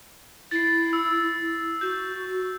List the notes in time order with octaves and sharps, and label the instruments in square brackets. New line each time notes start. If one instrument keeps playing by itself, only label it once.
[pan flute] E4 [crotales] A6 C7
[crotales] E6
[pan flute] F#4 [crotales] G6